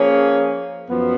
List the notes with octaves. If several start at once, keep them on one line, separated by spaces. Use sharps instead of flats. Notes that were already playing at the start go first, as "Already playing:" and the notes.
Already playing: F3 A#3 C#4 G#4 C#5
F#2 F3 B3